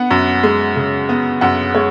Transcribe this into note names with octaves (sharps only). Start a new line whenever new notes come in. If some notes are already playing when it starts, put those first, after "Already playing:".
Already playing: B3 F#5
F#2
G#3
C#3
B3
F#2 F#5
G#3 C#5